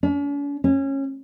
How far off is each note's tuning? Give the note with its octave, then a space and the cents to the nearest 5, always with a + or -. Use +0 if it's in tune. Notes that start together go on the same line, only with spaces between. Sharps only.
C#4 +45
C#4 -20